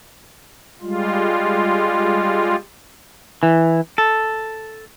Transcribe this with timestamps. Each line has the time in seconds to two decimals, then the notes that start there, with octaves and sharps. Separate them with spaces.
0.81 G3 G#3 F4
3.43 E3
3.98 A4